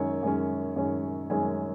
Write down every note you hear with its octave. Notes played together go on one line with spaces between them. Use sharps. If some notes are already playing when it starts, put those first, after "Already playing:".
Already playing: F#2 D#3 G#3 C#4 C#5
F#2 D#3 G#3 C#4
F#2 D#3 G#3 C#4
F#2 D#3 G#3 C#4 G#5